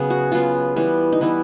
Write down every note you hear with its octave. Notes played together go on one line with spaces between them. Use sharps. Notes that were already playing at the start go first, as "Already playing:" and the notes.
Already playing: C#3 F#3 B3 G#4
F#4
C#3 F#3 B3 F4
E3 G3 B3
D#4
E3 G3 B3 E4